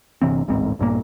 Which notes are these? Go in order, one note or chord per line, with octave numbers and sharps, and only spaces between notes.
G1 C3 E3 C4
D1 A1 G#2 C4
A#1 G2 A#2 A#3